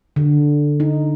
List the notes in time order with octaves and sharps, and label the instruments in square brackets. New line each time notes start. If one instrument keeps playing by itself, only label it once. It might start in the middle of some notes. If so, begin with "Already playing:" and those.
[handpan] D3
D#4